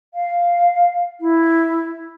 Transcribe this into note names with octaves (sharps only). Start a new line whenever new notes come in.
F5
E4